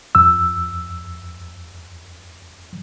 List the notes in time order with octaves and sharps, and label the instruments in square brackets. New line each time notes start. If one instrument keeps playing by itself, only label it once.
[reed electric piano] F2 E6